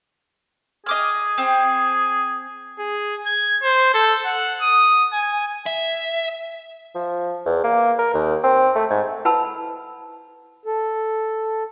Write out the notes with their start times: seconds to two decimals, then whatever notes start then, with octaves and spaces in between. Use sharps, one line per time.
0.86 G#4 D#5 D6 F6
1.38 C4
2.79 G#4
3.26 G#6
3.63 C5
3.94 A4
4.25 F#5
4.61 D#6
5.13 G#5
5.66 E5
6.95 F3
7.45 E2
7.64 A#3
7.99 A#4
8.14 D#2
8.44 C4
8.75 A3
8.90 G#2
9.25 E4 B4 F#5 A5 B5 E6
10.66 A4